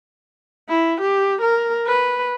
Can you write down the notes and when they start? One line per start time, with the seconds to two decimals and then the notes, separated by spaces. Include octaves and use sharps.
0.69 E4
1.01 G4
1.42 A#4
1.87 B4